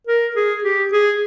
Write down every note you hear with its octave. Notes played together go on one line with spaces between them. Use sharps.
A#4
G#4
G4
G#4